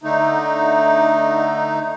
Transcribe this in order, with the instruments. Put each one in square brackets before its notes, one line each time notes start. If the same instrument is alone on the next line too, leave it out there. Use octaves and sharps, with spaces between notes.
[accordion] D3 A3 D#4